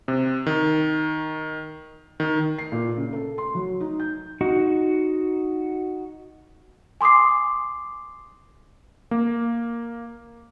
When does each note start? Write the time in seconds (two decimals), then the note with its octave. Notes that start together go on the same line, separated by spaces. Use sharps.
0.08 C3
0.46 D#3
2.20 D#3
2.59 C7
2.72 A#2
2.97 C#3
3.13 A4
3.38 C6
3.55 F#3
3.81 D#4
4.00 G6
4.41 D#4 F#4
7.01 G#5 C6 D6 D#6 C7
9.11 A#3